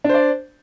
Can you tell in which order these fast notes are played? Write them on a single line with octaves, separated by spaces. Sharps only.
D4 C5 D5